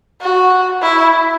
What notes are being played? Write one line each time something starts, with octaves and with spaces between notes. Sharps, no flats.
F#4
E4